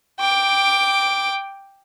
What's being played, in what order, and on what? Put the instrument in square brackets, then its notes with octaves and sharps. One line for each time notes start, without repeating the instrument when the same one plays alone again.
[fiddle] G5 D6